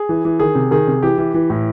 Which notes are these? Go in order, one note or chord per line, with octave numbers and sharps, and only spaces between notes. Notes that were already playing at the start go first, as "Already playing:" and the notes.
Already playing: G#4
E3
E3
D#3 G#4
C3
D#3 G#4
C3
E3 G4
E3
E3
A2